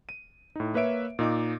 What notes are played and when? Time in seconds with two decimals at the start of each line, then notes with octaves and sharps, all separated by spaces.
0.09 D#7
0.56 A2 D#4
0.74 A#3 B4 C#5 E5 D7
1.19 A#2 D#4 D#5 D6